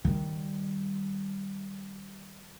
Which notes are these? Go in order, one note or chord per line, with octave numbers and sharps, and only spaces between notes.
D#3 G3